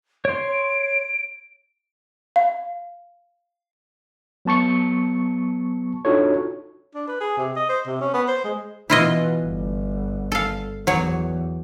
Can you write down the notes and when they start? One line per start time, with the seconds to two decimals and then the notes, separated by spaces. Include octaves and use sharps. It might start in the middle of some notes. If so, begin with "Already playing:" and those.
0.25 C#5 C6 D7
2.36 F5
4.45 F#3 B3 A5 C#6 C#7
6.05 D4 D#4 F4 F#4 A4 C#5
6.95 D4
7.08 B4
7.21 G#4
7.38 C3
7.56 D#5
7.69 C5
7.87 C3
8.01 C#4
8.14 B3
8.28 C5
8.44 G#3
8.90 B2 E3 E4 F4 D#5
9.42 G1
10.32 A4 F5
10.87 E2 F#3 C#5